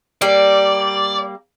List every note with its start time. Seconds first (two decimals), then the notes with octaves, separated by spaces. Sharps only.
0.22 G3 A#3 D5